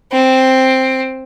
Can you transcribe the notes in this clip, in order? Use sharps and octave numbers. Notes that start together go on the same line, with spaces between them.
C4